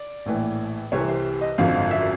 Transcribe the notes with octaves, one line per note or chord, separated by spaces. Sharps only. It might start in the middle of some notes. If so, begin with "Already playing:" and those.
Already playing: D5
A#1 A2 E3
C2 C3 E3 C#5
C5
D#5
G#1 F#2 D3 F3 F5
F5
E5